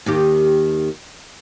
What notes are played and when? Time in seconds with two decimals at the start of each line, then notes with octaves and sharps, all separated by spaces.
0.06 D#2 D#3 G4